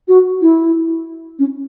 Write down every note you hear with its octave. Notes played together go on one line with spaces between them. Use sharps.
F#4
E4
C#4